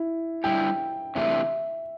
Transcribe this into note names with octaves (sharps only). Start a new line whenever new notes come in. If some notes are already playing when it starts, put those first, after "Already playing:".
Already playing: E4
D3 G3 E4 G4 G5
C3 E3 A3 D4 E5